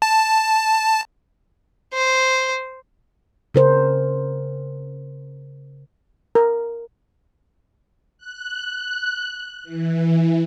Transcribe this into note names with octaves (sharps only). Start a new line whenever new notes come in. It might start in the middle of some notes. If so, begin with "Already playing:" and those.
A5
C5
C#3 A#4 C5
A#4
F#6
E3